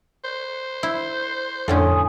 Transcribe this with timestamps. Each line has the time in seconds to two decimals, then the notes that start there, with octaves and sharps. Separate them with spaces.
0.24 C5
0.83 E4
1.68 F2 A2 D3 C#4 A4 G#5 C6 D#6